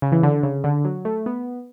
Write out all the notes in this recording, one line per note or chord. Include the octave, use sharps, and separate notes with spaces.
C#3
E3
D3
C#3
D3
F#3
A3
B3